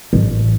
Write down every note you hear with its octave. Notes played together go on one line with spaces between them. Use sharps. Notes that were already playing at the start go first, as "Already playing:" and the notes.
A1